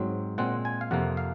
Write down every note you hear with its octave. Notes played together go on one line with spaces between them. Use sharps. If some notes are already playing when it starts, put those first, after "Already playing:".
Already playing: G#2 F#3 C4
A#2 G#3 C4 F#5
G#5
F5
F2 C3 F3 A#3 F#5
F5